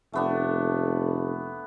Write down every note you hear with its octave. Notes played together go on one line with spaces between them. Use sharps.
F1 A3 B3 D4